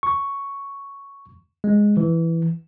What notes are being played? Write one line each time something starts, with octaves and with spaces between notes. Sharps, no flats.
C#6
G#3
E3